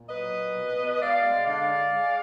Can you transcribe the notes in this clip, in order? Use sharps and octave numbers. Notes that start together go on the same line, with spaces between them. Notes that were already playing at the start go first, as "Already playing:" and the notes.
Already playing: A#2
F#3 B4 D#5
A#2
B2
B2
G#3 D5 F5
G#3
D3 D5 F5
D3
G#3